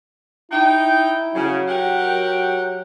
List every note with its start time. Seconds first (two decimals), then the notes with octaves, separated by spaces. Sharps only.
0.51 D#4 E4 G5
1.35 C#3 F#3
1.68 G4 A#4 F#5